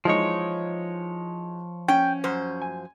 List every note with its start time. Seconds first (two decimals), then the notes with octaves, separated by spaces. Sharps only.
0.05 E3 F3 G#3 D#4 C#5
1.88 C#4 G5
2.24 F#2 C5
2.62 G#5